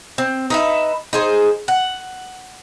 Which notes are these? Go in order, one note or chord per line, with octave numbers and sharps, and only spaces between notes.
C4
D#4 B4 E5
D#4 G#4 C5
F#5